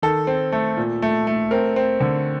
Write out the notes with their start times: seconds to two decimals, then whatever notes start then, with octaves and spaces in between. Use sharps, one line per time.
0.02 D#3 A4
0.27 C4
0.52 A3
0.77 A#2
1.02 A3
1.27 A3
1.51 C4 A#4
1.76 C4
2.00 D3